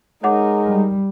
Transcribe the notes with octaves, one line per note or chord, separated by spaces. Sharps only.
G#3 D#4 A#4 C#5 F#5 D6
G3